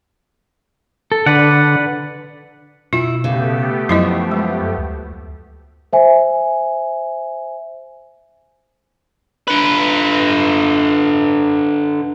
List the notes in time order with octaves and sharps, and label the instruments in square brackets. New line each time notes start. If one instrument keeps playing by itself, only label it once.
[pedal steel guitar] A4
[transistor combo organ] D3 [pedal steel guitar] B4 D5 F#5
[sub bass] B2 [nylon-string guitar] E4 [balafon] F4
[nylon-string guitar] C#3 [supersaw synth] A3 B3 G4
[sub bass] F#2 [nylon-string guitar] F3 [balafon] F#3 E4 D#5
[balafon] G#3
[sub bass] D2
[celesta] C5 E5 G#5
[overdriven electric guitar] D3 B4